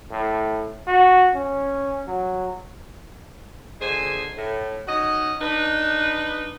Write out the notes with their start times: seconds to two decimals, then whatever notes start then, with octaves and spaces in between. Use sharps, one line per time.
0.12 A2
0.87 F#4
1.35 C#4
2.08 F#3
3.81 A#2 D3 G#3 G#4 C5 G#5
4.37 A2
4.88 C#4 D#4 F#4 D#5
5.42 D4 D#4 B4